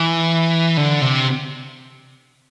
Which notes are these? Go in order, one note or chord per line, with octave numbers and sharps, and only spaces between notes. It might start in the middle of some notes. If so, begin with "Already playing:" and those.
Already playing: E3
D3
C3